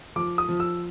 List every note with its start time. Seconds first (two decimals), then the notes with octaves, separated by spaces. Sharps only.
0.16 F3 D6
0.38 D#6
0.49 F3
0.60 E6